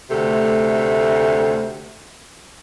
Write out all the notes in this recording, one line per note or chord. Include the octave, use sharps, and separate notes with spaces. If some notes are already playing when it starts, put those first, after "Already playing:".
D2 C3 A3